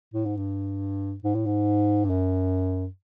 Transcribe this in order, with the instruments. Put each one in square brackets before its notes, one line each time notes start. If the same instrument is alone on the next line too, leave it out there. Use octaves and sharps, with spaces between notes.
[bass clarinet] A2
G#2
G2
G#2
A2
G#2
G2
F#2